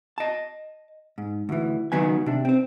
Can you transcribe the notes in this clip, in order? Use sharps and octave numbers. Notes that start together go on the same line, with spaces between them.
D#5 A5
G#2
D2 E3
C#2 D#3 F#3 B3 G#5
C3 D4
C4 C5